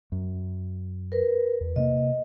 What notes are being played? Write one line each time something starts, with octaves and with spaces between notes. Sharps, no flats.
F#2
A#4 B4
E2
C3 A3 A#3 D#5